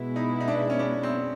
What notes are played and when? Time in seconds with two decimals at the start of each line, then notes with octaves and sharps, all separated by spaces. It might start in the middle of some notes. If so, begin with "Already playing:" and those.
Already playing: B2 G#3 B3 E4
0.16 D#4
0.40 D#4
0.48 D4
0.70 C#4
0.79 D4
1.03 C4